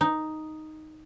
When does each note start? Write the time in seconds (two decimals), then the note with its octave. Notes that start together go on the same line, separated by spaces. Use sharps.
0.01 D#4